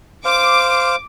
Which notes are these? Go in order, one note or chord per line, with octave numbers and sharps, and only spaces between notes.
C5 F5 D6